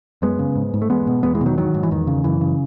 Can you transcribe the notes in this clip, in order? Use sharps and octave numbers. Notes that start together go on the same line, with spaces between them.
F#2 G#3 B3
C#3
G#2
G#2
A3
E2 G#3 B3
B2
E2 G#3 B3
E3 G#3
B2
D#3 F#3
G#2 D#3 F#3
G#2
E3
E2 D#3
C#3
F#2 E3
C#3